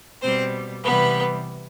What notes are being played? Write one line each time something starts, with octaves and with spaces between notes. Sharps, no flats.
B2 G3 C4 C5
C3 E3 G3 B3 B4